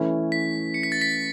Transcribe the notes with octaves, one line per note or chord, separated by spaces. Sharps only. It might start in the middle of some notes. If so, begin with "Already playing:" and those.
Already playing: E3 A3 C#4 E4 B4
B6
C#7
B6
A6
B6